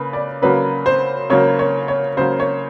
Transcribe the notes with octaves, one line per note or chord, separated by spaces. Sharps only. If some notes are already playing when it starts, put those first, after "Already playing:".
Already playing: C#3 A#3 B4
D5
C#3 F#3 A#3 B4
C5
C#3 F#3 A#3 C#5
C#5
C#5
C#3 F#3 A#3 C5
C#5